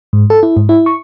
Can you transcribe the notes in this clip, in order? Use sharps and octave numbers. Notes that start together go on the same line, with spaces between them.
G#2
A4
E4
G#2
E4
C#6